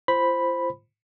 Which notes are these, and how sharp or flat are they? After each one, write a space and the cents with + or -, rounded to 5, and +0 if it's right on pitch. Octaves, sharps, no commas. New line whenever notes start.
F4 -35 C5 +0 B5 +0